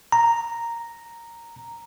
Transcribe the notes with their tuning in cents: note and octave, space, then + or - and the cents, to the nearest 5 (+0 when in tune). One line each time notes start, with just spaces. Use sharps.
A#5 -5